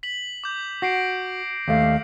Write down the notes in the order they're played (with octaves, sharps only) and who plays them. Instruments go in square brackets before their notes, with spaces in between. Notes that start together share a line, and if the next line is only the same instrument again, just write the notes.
[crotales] B6 F#7
D6 G6
[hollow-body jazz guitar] F#4 [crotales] A#6 C7 D7
[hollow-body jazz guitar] D#2 A3 [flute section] F5